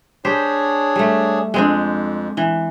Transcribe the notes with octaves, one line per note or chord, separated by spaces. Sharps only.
D4 G4 G#4 C5 C#5
G3 A3
F2 G#3 C4 D4
E3